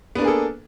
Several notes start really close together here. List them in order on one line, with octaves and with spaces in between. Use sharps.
B3 D4 A#3 G#4 A4